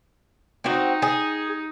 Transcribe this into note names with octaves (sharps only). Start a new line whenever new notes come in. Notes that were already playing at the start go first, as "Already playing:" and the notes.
C4 D#4 F#4
G#4